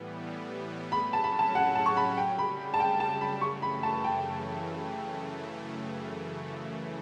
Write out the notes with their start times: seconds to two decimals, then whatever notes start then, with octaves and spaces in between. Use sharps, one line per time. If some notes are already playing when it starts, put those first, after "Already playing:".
Already playing: A2 E3 G3 B3
0.92 A2 F#3 C#4 B5
1.13 A5
1.24 B5
1.39 A5
1.55 F#5
1.75 A5
1.86 C#6
1.97 B5
2.17 F#2 C#3 G3 G5
2.39 B5
2.74 A5
2.80 G5
3.00 A5
3.21 B5
3.41 F#2 C#3 E3 A3 C#6
3.62 B5
3.83 A5
4.04 G5